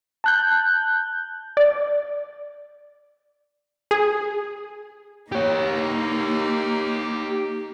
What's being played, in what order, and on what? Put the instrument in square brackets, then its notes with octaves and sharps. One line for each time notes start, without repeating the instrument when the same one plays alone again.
[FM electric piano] A5 F#6 G6
[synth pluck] D5
G#4
[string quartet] A#3 D#4 [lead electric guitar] G4 C#5